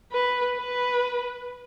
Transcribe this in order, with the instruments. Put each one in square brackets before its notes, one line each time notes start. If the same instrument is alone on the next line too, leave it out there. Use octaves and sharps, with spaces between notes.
[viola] B4
B4